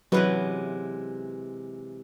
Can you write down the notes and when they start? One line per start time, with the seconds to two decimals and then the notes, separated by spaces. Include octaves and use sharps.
0.12 C3 E3 F#3 G#3 B4